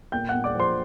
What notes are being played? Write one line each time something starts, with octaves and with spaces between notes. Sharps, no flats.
A#2 G5 G6
F#5 F#6
A#2
D5 D6
F3 C5 C6